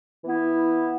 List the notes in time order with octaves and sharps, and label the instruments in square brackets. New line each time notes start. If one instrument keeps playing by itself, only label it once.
[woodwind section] E3 B3 E4